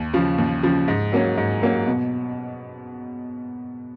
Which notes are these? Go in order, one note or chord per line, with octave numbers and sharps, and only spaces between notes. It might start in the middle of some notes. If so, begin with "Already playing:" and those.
Already playing: D#2
C#3 F3
D#2
C#3 F3
G#2
F#3 A#3 C#4
G#2
F#3 A#3 C#4
B2